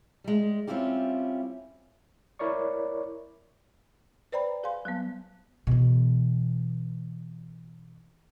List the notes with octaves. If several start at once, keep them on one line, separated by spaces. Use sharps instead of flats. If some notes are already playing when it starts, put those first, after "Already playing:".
G3 G#3
G3 C4 C#4 E4 F4 G4
E4 A#4 C#5 D5 C#6
B4 C5 D5 G5 A#5 B5
G#4 F5 G#5 C6
F#3 G3 B3
B2 E3